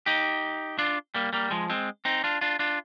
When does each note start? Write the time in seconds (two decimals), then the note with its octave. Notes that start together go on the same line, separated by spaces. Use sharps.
0.06 D#4 G4
0.79 D4 F4
1.15 G3 A#3
1.33 G3 A#3
1.51 F3 G#3
1.70 G#3 C4
2.05 C4 D#4
2.24 D4 F4
2.41 D4 F4
2.59 D4 F4